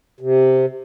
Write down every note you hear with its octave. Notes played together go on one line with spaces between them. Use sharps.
C3